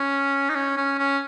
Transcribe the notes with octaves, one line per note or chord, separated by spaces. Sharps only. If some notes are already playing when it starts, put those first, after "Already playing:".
Already playing: C#4
D#4
C#4
C#4
C#4